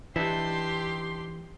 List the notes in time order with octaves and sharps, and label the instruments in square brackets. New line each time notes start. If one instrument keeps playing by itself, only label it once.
[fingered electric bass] E3 [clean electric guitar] D4 D#4 E5 [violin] G4 C6